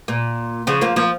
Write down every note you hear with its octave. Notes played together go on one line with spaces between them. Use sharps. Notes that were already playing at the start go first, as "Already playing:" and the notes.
A#2
C#3 F3
F3 A#3
F3 A#3